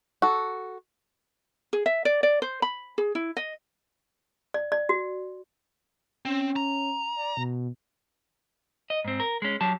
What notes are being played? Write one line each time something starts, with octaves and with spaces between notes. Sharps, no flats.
F#4 A4
G#4
E5
D5
D5
C5
B5
G#4
E4
D#5
D5
D5
F#4
C4 C#4
A#5
D5
B2
D#5
G#2 C4
A#4
G#3 C#4
F#3 G4 A5